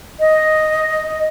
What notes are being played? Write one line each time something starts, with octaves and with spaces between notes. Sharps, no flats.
D#5